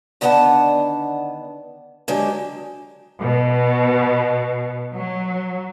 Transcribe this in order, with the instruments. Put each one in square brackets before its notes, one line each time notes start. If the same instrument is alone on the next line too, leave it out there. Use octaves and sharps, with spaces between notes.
[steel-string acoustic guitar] D3 D#3 B3 D4 F#5 A5
D3 D#3 F#3 G#3 G4
[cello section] B2
F#3